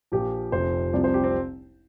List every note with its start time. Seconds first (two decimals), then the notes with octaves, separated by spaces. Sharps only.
0.12 A#1 A#2 F3 G4
0.52 F1 F2 C3 F3 C5
0.93 C2 C3 F3 D5
1.04 C5
1.14 G4
1.24 C4